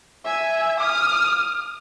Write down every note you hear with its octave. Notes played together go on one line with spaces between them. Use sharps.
E5 G#5
D#6 F6